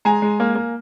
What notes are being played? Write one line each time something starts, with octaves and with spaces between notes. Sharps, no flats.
G#3 G#5 A#5
G#3
A#3
A#3